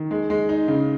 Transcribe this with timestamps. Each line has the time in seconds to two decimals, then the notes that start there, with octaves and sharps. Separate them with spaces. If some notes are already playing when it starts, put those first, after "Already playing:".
Already playing: D#3
0.11 G#3
0.30 G#3
0.49 D#4
0.68 C#3